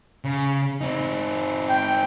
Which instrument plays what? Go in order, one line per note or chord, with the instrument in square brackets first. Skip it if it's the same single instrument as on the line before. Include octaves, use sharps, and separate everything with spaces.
[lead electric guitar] C#3
C4 D#4
[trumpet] G5